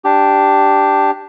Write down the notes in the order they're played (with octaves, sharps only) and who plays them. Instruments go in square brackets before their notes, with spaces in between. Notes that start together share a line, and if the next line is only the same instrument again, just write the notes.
[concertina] D4 G4